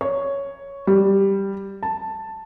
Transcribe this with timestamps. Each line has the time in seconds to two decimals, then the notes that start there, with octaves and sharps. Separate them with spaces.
0.01 C#5
0.87 G3
1.83 A5